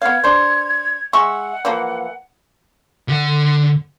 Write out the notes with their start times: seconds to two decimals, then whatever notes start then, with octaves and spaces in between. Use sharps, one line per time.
0.02 B3 F5 G#6
0.24 D4 C5
1.13 G#3 E5 F#5 C#6
1.65 E3 F3 A#3
3.08 D3 F#5